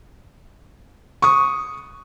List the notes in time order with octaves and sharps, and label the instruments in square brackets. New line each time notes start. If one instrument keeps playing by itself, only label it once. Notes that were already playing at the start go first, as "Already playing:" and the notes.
[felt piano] C#6 D#6